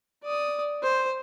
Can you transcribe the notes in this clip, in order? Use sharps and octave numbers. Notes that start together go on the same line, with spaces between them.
D5 D#6
C5